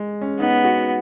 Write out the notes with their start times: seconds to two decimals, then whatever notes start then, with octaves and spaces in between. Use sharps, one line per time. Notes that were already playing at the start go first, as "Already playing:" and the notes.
Already playing: G#3
0.21 C#4
0.40 B3 D#4
0.65 F#4